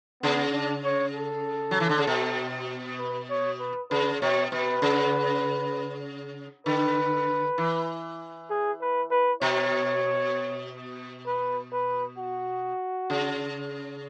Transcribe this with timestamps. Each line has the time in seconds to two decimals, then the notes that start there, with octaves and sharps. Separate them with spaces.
0.22 C#3 B3
0.54 D4
0.84 C#5
1.15 A4
1.71 F#3
1.80 E3
1.89 D3
1.98 C#3
2.07 B2
2.99 B4
3.30 C#5
3.60 B4
3.90 C#3 B4
4.22 B2 C#5
4.52 B2 B4
4.82 C#3
6.66 D3 B4
7.58 E3
8.50 G#4
8.81 B4
9.11 B4
9.41 B2 C#5
11.26 B4
11.72 B4
12.18 F#4
13.10 C#3